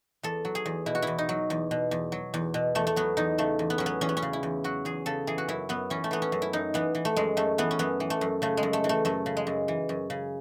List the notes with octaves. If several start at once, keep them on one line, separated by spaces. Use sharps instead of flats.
E2 A4
F#3
G#4
E2
B2 E4
F#4
E2 E4
D#4
F#3
E2
B2
E2
F#3
E2
B2
E2 A3
A3
F#3 B3
E2 D#4
C#3 A3
E2
B3
F#3 C#4
B3
E2 C#4
B3
C#4
C#3
E4
E2
F#3 F#4
E2 G#4
C#3 A4
E3 G#4
F#4
F#2 E4
F#2 B3
E3 C#4
A3
E3 B3
C#4
F#2
E4
F#2 D#4
E3 B3
E3
A3
F#2 G#3
F#2 A3
E3 B3
C#4
F#2 B3
E3
A3
F#2
C#3 A3
G#3
F#2
A3
E3
A3
F#2 A3
C#3
G#3
F#2
E3
F#2
C#3